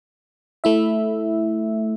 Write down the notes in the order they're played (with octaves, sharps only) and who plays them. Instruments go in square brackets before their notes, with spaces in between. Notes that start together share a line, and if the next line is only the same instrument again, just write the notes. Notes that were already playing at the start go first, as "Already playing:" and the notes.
[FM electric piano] A3 E4 E5